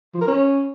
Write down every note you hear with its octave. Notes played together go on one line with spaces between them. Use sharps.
F3
A#4
C#4